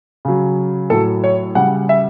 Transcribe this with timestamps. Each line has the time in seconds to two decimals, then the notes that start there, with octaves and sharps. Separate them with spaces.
0.25 C#3 F#3
0.90 A2 F#3 A4
1.24 C#5
1.55 C#3 G3 F#5
1.89 E5